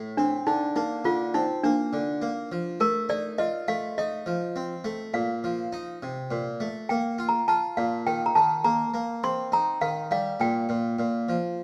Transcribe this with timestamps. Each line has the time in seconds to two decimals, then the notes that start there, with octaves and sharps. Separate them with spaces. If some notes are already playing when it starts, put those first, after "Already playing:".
Already playing: A2
0.17 C4 D4
0.47 D3 D#4
0.76 A#3 D#4
1.05 D3 F4
1.34 C4 D#4
1.64 A#3 D4
1.93 D3
2.22 A#3
2.52 F3
2.80 A3 A#4
3.09 D#4 D5
3.38 F4 D#5
3.68 A3 F5
3.98 D#4 D#5
4.26 F3
4.56 C4
4.84 A3
5.14 A#2 F5
5.44 F3
5.73 D#4
6.02 C3
6.31 A#2
6.60 A3
6.89 A#3 G5
7.19 F4
7.29 A#5
7.48 F4 A5
7.77 A#2 F5
8.07 D#3 G5
8.26 A#5
8.35 D#3 A5
8.64 A#3 A#5
8.94 A#3
9.24 C4 C6
9.52 D#4 A#5
9.81 D#3 F5
10.11 G3 F5
10.40 A#2 G5
10.69 A#2
10.99 A#2
11.29 F3